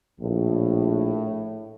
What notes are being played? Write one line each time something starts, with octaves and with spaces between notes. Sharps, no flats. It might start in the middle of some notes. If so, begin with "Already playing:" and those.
A#1 A2